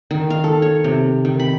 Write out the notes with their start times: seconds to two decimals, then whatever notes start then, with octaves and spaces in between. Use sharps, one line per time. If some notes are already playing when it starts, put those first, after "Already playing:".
0.11 D#3
0.30 F5
0.44 A4
0.62 C#5
0.84 C3
1.25 D#3
1.40 B5